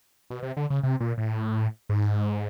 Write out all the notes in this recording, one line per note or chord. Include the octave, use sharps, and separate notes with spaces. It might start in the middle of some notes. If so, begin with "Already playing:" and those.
B2
C3
D3
C#3
C3
A#2
A2
G#2